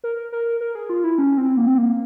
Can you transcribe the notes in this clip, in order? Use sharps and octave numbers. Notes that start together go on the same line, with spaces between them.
A#4
A#4
A#4
G#4
F4
E4
C#4
C4
A#3
C4
A#3